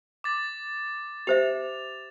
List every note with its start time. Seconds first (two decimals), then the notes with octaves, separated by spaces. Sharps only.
0.24 D6 A6
1.27 G4 C5 E5 F7